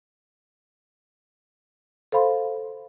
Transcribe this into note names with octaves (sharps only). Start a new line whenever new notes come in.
A4 C5 F5 B5 C6